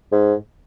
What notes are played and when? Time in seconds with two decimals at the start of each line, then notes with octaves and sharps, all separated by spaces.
0.12 G#2